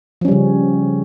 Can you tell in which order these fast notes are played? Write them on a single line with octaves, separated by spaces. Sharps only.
F3 C#4 G3 C#3